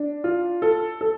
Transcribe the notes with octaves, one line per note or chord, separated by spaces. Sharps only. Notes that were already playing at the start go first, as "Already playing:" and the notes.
Already playing: D4
F4
A4
A4